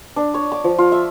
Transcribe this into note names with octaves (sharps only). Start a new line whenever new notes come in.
D4
C#5
D6
F3
F4
E5